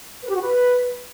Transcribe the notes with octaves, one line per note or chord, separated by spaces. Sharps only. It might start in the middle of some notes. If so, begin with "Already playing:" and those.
B4
G4
F#4
B4